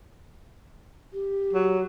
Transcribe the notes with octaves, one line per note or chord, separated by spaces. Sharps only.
G4
F#3